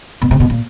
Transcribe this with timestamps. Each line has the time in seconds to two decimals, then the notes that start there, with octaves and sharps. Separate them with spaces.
0.22 B2
0.31 C3
0.40 B2
0.50 A#2